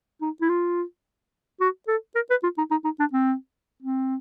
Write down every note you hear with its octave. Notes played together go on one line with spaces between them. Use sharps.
D#4
E4
F4
F#4
A4
A#4
B4
F4
D#4
D#4
D#4
D4
C4
C4